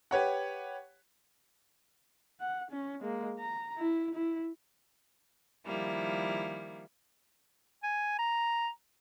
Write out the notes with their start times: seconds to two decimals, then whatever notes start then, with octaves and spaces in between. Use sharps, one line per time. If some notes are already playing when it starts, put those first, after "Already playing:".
0.11 G4 B4 C#5 F#5
2.40 F#5
2.71 C#4
3.01 G#3 A#3
3.39 A#5
3.78 E4
4.15 E4
5.67 D#3 F3 G3 A#3 E4
7.83 G#5
8.19 A#5